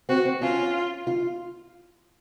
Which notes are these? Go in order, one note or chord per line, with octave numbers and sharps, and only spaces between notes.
C4 F#4
C4
C#4 F4
F4